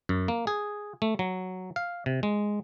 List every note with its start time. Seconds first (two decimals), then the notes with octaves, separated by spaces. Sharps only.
0.09 F#2
0.28 A#3
0.47 G#4
1.02 A3
1.19 F#3
1.76 F5
2.06 C3
2.23 G#3